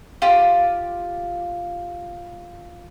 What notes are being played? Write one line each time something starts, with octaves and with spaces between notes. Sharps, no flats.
F4 G4